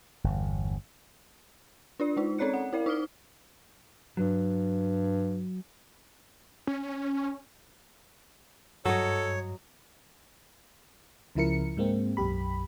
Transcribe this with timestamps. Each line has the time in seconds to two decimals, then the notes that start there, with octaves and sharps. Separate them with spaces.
0.24 G1 E2
2.00 D4 F4 D5
2.17 G#3 D#4
2.38 C4 C#4 C#5 D5 F#6 C#7
2.54 F#5
2.73 E4 A#4 D5 F5
2.86 D#4 D6 D#6 F6 G7
4.17 G2 F#3
6.67 C#4
8.85 G2 F#3 A4 C#5 D#5
11.35 C#2 C#3 F3 E4 A#4 C#7
11.77 G#2 G#3 A#3 C4
12.17 B1 F#2 G4 B5